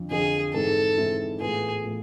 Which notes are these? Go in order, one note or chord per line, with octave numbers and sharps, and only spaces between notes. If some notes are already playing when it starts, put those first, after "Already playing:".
Already playing: F2 D3 F3
F2 D3 F3 G#4
G#2 E3 G#3 C4 E4 A4
G#2 E3 G#3 C4 E4
A2 E3 B3 F4 G#4
A2 E3 B3 F4